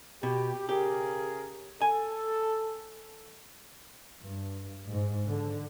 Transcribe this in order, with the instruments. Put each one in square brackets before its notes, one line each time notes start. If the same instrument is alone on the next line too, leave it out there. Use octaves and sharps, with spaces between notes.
[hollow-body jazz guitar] B2 [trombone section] G4
[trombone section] C#3 G#4 A#4 [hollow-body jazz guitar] G4
[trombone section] A4 [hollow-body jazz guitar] G#5
[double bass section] G2
G#2
D3